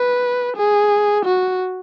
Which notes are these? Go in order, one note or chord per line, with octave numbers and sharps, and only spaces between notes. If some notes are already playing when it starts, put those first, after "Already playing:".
Already playing: B4
G#4
F#4